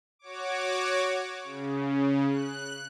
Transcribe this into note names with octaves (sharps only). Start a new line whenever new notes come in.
F#4 C#5 D6
C#3
F#6